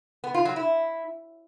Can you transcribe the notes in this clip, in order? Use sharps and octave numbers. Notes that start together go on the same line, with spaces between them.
B3
F4
F#3
E4